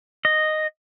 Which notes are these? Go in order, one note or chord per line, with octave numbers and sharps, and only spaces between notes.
D#5